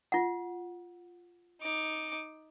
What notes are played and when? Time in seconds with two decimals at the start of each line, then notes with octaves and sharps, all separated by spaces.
0.12 F4 F#5
1.62 D#4 D6